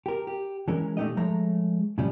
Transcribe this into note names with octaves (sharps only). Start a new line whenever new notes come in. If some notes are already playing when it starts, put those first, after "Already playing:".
G4 A#4
G4
E3 G#3 C#4 A#4
A#2 A3 B3 D#4 G4 D#5
F3 G#3 A3 C#5 A#5
A2 C#3 F3 G3 C#4